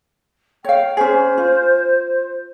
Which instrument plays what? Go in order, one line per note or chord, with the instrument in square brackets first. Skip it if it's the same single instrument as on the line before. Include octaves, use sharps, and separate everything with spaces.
[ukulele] C#5 F5 [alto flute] G5
[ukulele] C#4 G#4 [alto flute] C5
[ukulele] F4